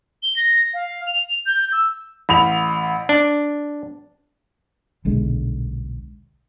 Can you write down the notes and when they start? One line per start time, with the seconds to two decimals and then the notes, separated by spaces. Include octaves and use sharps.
0.23 G7
0.36 A#6
0.74 F5
1.07 F7
1.46 G6
1.72 E6
2.29 A1 B5 F7
3.09 D4
5.05 D#1 B1 D3 G#3